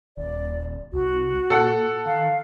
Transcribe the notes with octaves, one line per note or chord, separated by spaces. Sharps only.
D#1 D5
C2 F#4
A#2 A4 F#5
D#3 F5